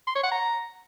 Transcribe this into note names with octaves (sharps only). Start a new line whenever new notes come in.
C6
C#5
F#5
A#5